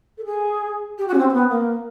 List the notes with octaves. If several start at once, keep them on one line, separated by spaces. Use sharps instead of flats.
A4
G#4
G4
F#4
C#4
C4
C4
B3
A#3